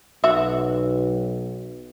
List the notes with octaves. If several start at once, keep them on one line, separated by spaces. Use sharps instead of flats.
B1 F#4 E5